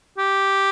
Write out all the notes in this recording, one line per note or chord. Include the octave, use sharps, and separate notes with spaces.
G4